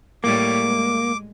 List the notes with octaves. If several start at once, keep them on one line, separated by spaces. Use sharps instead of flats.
A2 G3 A#3 C#5 D6
G#3